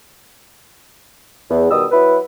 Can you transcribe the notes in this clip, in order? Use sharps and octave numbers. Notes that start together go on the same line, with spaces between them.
E2
B2 D#3 G3 D#6 E6
F#3 E4 B4